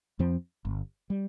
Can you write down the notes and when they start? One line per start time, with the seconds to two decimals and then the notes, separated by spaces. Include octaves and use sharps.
0.19 F2 F3 C4
0.65 G1
1.10 G3